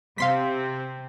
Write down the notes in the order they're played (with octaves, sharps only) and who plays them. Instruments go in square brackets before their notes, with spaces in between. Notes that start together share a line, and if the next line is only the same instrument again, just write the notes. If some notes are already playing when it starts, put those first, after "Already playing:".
[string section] C3 C4 [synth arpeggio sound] F5 C6 B6